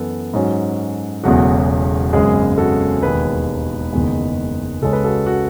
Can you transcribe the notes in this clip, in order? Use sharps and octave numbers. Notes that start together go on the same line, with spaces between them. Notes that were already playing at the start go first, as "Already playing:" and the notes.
Already playing: F#2 E3 B3 A4
G#2 F#3 C#4
E1 E2 C#3 F#3 A3 F#4
G#1 F#2 C#3 G#3 G#4
F#4 A4
E1 D#2 D#3 G#4 B4
F#1 E2 D#3 G#3
C#2 C#3 G#3 C#4 A4
B4
F#4 A4
F#4